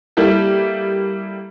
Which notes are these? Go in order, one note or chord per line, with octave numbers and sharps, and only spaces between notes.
G3 A#3 E4 G4 A4